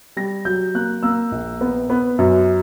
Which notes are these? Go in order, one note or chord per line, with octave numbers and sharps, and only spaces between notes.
G3 A#6
F#3 G6
A#3 F#6
A#3 E6
A#1
B3
B3
F#2